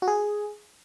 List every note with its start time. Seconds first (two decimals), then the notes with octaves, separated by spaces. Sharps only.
0.02 F#4
0.07 G#4